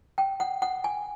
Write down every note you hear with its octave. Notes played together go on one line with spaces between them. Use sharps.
G5
F#5
F#5
G#5